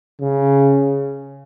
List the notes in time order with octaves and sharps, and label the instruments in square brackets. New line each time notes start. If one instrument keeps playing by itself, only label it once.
[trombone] C#3